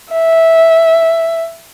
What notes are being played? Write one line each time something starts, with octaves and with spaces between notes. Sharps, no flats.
E5